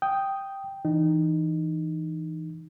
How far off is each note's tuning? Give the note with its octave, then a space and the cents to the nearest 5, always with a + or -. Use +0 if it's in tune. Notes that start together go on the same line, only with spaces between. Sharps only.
G5 +0 D#6 +0
E3 -10 D#4 -20